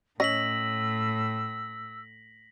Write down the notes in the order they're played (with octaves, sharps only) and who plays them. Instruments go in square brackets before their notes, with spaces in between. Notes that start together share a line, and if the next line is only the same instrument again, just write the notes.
[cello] A2 [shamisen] C#4 D#5 [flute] E6 [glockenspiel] A#6 B6 F#7